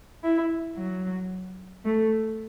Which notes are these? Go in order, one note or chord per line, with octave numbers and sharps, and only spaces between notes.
E4
F#3
A3